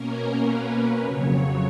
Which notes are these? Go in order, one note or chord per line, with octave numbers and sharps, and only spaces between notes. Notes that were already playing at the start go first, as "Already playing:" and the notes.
Already playing: B2 A#3 C#4 A#4
B4
F2 C#3 F#3 C#5